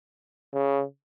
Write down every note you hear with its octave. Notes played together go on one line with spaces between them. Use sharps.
C#3